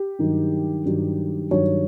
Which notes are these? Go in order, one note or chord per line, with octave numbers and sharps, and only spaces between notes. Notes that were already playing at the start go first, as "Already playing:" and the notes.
Already playing: G4
G2 D#3 F#3
G2 D#3 F#3
G2 D#3 F#3 C#5